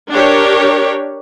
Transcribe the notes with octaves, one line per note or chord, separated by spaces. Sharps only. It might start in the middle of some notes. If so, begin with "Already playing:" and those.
D4 G4 A#4 C#5